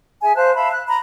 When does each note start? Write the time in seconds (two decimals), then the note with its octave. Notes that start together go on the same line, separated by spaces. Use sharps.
0.22 G#4 E5 G#5
0.35 C5 F5 A5 F#6
0.56 E5 F5 A5 B5
0.72 F#6
0.87 A#5 B5